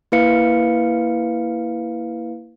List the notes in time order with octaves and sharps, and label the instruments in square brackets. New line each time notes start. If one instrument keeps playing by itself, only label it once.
[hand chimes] A#3 E4 B4 F5 C#7